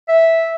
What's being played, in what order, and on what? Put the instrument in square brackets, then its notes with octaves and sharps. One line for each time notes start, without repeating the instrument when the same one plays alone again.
[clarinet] E5